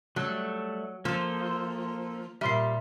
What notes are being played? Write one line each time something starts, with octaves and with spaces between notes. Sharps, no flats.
F#3 G3 A3 A4
F3 A#3 A4 C5 E7
A#2 G3 E5 C6 F6 C7